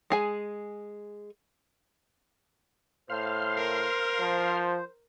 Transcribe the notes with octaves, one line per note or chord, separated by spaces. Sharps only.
G#3 G#4 G#5
A2 C5 F5 C6 F6
A#4
F3